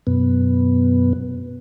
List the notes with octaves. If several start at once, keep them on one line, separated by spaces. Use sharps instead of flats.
F#2 B2 B3